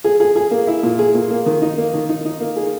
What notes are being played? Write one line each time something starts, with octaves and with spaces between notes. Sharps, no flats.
G#4
G#4
G#4
A#3
E4
A#2
G#4
A#2
A#3
D#3
D#4
A#3
D#3
D#4
D#4
A#3
G#4